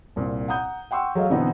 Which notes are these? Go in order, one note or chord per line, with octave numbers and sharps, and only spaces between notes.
C2 A#2 C4
F#5 A#5 D#6 G6
F#5 G5 C6 C#6 E6
F#3 G#3 A3 C#5 D#5 F5
B2 D3 E3 B3 C4 D#4